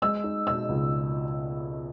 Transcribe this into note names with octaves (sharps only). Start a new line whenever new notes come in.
G#3 E6
D#4
B2 E6
C#2